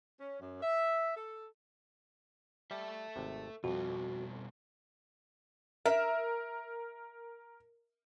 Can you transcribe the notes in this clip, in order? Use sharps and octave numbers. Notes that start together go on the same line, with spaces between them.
C#4
F#2
E5
A4
G3 A4 E5
G#1 C3
F2 B2 G3 F#4
A#4 E5